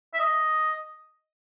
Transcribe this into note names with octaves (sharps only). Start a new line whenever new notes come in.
E5
D#5